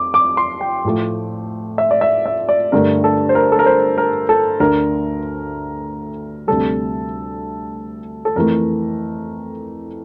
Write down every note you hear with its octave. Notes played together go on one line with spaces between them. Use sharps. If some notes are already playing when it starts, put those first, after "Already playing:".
Already playing: F2 D6
D6
C6
G5
A2 F3 A3
E5
D5
E5
E5
D5
G2 D3 A3 A#4
A4
C5
A#4
A4
A#4
C5
A#4
A4
D2 D3 A3 A#4
D2 C3 G3 A4
A4
F2 E3 A3 A#4